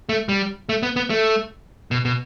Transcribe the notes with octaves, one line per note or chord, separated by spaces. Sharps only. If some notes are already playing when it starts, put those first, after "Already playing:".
A3
G3
A3
B3
B3
A3
B2
B2